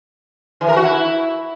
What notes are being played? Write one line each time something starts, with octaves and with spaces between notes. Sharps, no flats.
E3
A#4
F#4
E4